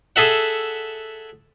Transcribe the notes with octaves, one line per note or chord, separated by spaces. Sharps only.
G#4 A4 E5 F#5